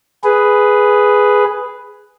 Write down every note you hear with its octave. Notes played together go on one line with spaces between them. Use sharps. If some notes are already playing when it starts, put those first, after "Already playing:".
G#4 B4